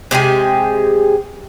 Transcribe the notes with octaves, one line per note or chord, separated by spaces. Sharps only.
C3 G#3 G4 G#4